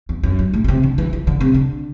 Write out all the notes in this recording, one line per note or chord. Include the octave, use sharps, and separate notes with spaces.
E2
F#2
G2
A2
B2
C3
D3
E3
E3
D3
C3
D3